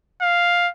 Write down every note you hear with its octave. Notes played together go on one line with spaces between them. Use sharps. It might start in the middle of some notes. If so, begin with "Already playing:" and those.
F5